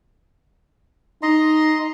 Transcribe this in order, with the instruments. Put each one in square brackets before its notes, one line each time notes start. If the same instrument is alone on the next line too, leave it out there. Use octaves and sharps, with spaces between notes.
[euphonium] D#4 [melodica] D#5 A#5 C6